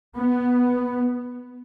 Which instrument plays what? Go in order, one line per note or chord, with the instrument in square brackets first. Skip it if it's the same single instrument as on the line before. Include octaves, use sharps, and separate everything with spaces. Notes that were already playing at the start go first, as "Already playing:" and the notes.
[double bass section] B3